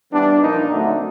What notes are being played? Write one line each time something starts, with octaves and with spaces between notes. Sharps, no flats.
E3 G3 B3 D4
A#2 F3 A#3 D#4
D3 F#3 A3 C4